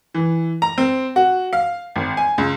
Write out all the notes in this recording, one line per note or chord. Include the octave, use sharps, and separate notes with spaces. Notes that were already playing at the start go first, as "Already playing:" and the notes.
E3
A#5
C4
F#4
F5
G#1
G#5
C#2